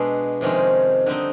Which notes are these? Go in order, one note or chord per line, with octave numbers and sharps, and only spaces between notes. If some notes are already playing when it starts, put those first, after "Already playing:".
Already playing: B2 G#3 B3 D4
F2 C3 D#3 G#3 C#4
D3 G3 C4 D#4